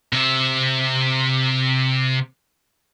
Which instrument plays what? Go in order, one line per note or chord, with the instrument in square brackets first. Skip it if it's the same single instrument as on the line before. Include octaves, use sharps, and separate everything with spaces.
[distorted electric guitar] C3 E5